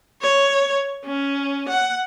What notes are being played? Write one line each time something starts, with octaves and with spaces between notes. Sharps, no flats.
C#5
C#4
F#5